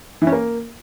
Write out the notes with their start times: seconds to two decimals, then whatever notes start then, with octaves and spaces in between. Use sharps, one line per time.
0.22 E3
0.27 C#4
0.32 A#3